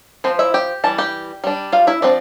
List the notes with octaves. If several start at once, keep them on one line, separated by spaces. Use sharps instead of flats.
F3 C4 C5
E4 E5
G4 G5
E3 G3 A5
G4 G5
G3 D4
F4 F5
E4 E5
F3 C4 D4 D5